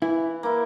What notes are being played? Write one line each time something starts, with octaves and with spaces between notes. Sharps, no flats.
E3 E4
A#3 E4